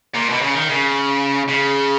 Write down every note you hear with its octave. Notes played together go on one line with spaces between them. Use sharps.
A#2
B2
C#3
D#3
C#3
C#3